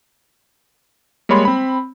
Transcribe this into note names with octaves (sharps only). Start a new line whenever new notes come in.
G3 G#3 A#3 C#5 B5 C6
C4 B5